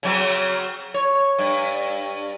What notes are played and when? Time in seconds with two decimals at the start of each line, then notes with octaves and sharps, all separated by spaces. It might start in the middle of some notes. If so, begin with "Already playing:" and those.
0.03 C#3 F#3 C4
0.94 C#5
1.39 G2